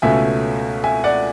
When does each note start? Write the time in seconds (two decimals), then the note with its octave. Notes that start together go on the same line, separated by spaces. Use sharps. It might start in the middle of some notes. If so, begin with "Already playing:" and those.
0.02 C#2 B2 A3 C#4 E5 G#5
0.83 E5 G#5
1.04 D5 F#5